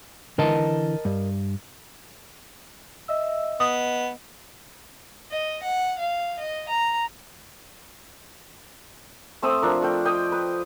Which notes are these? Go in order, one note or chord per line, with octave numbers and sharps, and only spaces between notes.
D3 E3 A#4 D#5 A5
G2
D#5 E5 E6
B3 D#5 D#6
D#5
F#5
F5
D#5
A#5
A3 C4 E5 D#6
F3 D4 A#4
A3 G5
D#5 G5 D6 D#6
B4